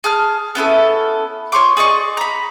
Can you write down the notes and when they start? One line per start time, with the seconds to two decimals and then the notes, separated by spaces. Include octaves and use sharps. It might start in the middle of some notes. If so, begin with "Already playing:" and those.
0.04 G#4 A5 F6
0.55 B3 C#4 E4 A4
1.52 F4 C#5 C6 D6
1.77 G#4 D5 D#5 C#6
2.17 A#5 B5